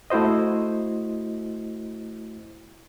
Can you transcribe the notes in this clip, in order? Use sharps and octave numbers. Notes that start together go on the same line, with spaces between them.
A3 E4 F#4 C5 D#5